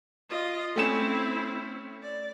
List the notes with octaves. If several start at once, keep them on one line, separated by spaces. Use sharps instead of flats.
F4 D#5
A3 C4 C#4 E4 E7
D5